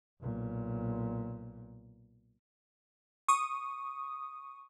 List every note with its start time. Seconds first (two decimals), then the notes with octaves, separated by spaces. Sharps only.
0.21 B1 A#2
3.28 C#6 D#6